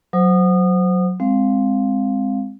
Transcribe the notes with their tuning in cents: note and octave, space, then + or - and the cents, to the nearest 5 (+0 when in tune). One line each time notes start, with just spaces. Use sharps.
F#3 -5 C5 -10 D#6 -30
G#3 -20 C4 +0 F5 +5